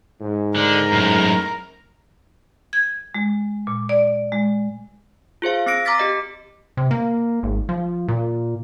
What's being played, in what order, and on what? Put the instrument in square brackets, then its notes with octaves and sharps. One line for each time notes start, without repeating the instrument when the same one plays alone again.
[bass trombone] G#2
[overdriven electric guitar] D3 [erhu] A#4
[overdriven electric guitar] F#2 A2
[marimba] G#6
G#3
A#2
D5
G#3
[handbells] F4 G#4 C5 F5
C4 E6 A#6 D7
A#5 D6 F6 A6 B6
G4 D#5 C7
[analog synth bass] C3
A#3
G#1
F3
A#2